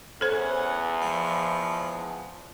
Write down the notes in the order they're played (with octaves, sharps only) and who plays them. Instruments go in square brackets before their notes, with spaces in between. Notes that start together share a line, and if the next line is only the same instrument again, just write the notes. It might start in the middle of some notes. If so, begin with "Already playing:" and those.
[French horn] E2 [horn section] C#4 F#5 [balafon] A4 C5
[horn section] F3 G#3